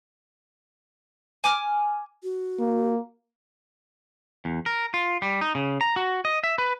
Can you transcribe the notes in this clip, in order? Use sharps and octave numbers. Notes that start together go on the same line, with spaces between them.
G#5 D6 F6
F#4
A#3
E2
A#4
F4
G3
D#4
C#3
A#5
F#4
D#5
E5
B4